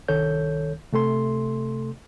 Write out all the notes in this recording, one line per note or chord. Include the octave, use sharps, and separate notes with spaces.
C2 D#3 A4 C#5 G6
C3 A3 A4 C6